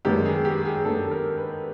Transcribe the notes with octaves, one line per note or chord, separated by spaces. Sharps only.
F#2 D#3 G#3 B3 D4 G4
G#4
G4
G#4
F#2 D#3 G#3 B3 D4 A4
A4
A#4
B4